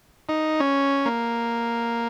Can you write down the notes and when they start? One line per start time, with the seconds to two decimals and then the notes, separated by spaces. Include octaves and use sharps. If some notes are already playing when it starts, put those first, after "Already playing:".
0.29 D#4
0.60 C#4
1.06 A#3